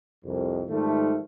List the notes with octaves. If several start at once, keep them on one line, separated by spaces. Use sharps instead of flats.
C2 F2
G#2 D#3 F3 G3 A3